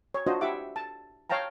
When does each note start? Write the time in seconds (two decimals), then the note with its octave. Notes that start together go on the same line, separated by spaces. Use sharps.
0.14 C#5
0.27 D4 F4 F#4 C5 D#5
0.41 E4 G4 E5 F#5 D6
0.76 A5
1.30 C#5 F5 G5 A5 A#5